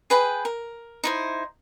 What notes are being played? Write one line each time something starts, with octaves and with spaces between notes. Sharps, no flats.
G#4 B4 G5 B5
A#4
D#4 E4 C5